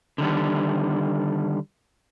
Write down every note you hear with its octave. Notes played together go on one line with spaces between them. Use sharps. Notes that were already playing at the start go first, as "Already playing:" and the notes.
D3 D#3 G3